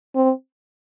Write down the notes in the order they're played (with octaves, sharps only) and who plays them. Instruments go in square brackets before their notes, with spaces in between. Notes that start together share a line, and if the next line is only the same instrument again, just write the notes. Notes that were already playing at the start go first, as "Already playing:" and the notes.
[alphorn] C4